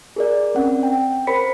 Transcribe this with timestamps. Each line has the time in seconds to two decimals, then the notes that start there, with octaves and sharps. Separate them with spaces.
0.16 G#4 A#4 D5
0.55 C4 C#4 F#5
0.83 G5
1.27 A#4 C5 B5 B6 C#7